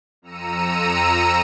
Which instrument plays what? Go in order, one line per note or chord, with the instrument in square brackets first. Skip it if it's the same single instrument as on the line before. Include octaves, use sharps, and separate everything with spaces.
[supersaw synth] F2 A#5 E6 C#7 D#7